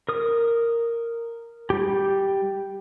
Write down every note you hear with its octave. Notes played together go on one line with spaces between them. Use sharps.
A#4 D#6
G3 G4